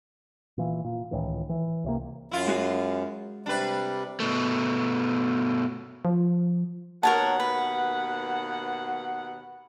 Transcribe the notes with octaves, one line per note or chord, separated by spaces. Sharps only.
A#2 E3
A#2
C#2 A2 D#3 E3
E3
C#2 C3 A#3
F#2 E4 F4
G#3 F#4 G#4
C3 G3 D4 B4
B2 A3
F3
D#2 B2 A#4 C#5 F#5 A5
B4